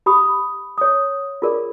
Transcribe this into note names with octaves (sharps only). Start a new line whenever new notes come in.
G4 B5 D#6
C#5 D#6
F4 G#4 A#4 D5